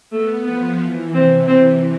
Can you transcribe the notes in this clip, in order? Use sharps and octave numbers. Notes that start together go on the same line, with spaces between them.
A3 B3
F3 B3
E3
C3 C4
C4